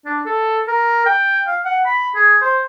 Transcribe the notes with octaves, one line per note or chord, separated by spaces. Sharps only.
D4
A4
A#4
G5
F5
F#5
B5
G#4
C5